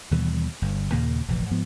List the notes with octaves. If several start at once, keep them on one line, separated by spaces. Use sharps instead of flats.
D#2 B2 E3 G3
G1 G2
D#2 A#2 C#3 A#3
F1 A#1 E3
G#2 F3 B3